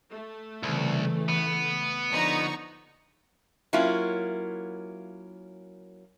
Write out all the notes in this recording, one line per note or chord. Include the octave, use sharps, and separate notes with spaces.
A3
C2 C#3 E3
B3
D3 F3 D#4 C#6
F#3 A#3 C#4 E4 F4